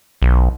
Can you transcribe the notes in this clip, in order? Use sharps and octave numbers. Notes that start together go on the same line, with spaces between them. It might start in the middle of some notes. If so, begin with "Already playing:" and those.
B1